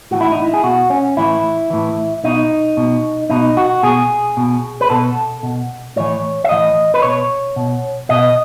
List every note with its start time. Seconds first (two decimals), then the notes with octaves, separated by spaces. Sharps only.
0.11 A2 E3 F#4
0.21 E4
0.32 D#4
0.42 E4
0.54 G#4
0.63 B2 F#4
0.90 C#4
1.17 A2 E3 E4
1.70 A2 E3
2.24 B2 D#4
2.77 B2
3.30 B2 D#4
3.57 F#4
3.83 B2 G#4
4.37 B2
4.81 B4
4.90 B2 A4
5.43 B2
5.96 A2 E3 C#5
6.44 E5
6.49 A2 E3 D#5
6.94 B4
7.02 B2 C#5
7.56 B2
8.09 B2 D#5